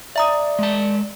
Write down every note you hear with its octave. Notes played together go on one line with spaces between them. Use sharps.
D5 E5 A#5 D#6
G#3 A5